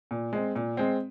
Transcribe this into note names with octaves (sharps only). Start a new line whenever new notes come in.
A#2
G#3 C4
A#2
G#3 C4